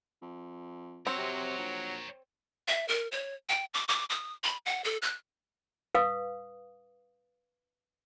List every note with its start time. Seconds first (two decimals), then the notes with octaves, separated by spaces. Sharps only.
0.22 F2
1.07 F#3 C4 A#4 C#5
1.18 C3 A#4 C#5
1.58 A#1
2.68 E5
2.88 A#4
3.12 C#5
3.49 G5
3.74 D6
3.88 D6
4.10 D#6
4.44 B5
4.66 F#5
4.84 A4
5.02 F#6
5.95 B4 F5 D#6